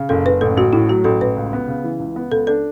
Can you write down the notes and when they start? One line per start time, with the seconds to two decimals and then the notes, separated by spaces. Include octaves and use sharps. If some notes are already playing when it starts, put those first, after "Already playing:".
Already playing: C#3
0.09 F#1 A4
0.25 F#1 B4
0.41 A1 A4
0.57 A1 F#4
0.73 A2 E4
0.89 F#3 F#4
1.04 A1 A4
1.21 A1 B4
1.36 C#2
1.53 B3
1.68 C#3
1.84 E3
2.00 C#2
2.16 B3
2.32 C#2 A4
2.47 D4 A4